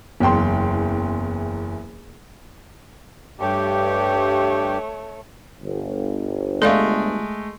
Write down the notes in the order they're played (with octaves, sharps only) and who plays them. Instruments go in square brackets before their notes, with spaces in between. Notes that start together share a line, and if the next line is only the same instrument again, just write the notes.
[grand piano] F#1 E2 G5 C6
[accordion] G2 G4 [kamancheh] A3 C#5
[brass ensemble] G1
[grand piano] G#3 A3 [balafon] A4 D5 F5